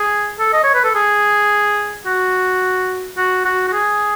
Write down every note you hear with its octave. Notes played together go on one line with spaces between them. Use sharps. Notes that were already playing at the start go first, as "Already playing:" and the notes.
Already playing: G#4
A4
D#5
C#5
B4
A4
G#4
F#4
F#4
F#4
F#4
G#4